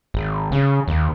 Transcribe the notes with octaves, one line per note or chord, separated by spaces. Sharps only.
G#1
C#3
D#2